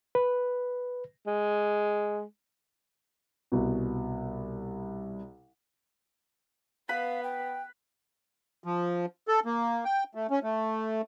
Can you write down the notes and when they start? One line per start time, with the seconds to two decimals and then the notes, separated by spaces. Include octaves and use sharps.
0.15 B4
1.27 G#3
3.52 C2 B2
6.89 B3 B4 F5 B5
7.23 G5
8.64 F3
9.28 A4
9.45 A#3
9.85 G5
10.15 A3
10.30 C#4
10.43 A3